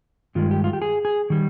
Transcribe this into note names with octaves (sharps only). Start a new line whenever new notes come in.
G2 D#3 G#3 F4
G4
F4
G4
G#4
G#4
D#3 G3